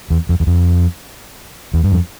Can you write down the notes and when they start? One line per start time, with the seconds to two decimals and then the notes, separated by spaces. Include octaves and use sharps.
0.10 E2
0.29 F2
0.40 E2
0.47 F2
1.74 E2
1.84 G2
1.92 F2